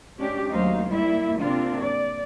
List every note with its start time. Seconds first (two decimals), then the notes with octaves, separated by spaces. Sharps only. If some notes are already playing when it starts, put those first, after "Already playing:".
0.19 G#3 C#4 D4 G4
0.51 D#2 F#3 A3 D#4 C5 F5
0.88 G3 A#3 E4 E5
1.39 C3 A#3 C4 D4 F4
1.79 D5